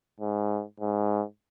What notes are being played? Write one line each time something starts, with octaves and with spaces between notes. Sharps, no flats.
G#2
G#2